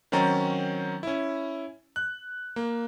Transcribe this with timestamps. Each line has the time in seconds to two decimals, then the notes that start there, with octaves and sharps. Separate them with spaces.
0.12 D#3 F#3 C4 C#4 A#5 A6
1.03 C#4 E4
1.96 F#6
2.56 A#3